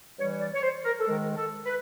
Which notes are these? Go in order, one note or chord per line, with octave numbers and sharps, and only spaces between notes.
G2 E3 G3 C#5
D5
C#5
C5
A#4
A4
G#2 D#3 G#3 A#4
A4
B4